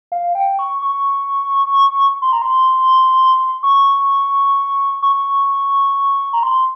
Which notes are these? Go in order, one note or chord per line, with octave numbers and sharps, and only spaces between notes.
F5
G5
C#6
C#6
C6
A#5
C6
C#6
C#6
A#5
C6